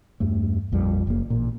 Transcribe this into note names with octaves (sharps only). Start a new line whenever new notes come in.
E2 G2 A3
A#1 F2 G3
F#1 A#3
A1 A#2